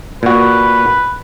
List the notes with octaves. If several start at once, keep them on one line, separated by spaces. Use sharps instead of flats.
A#2 F#4 B4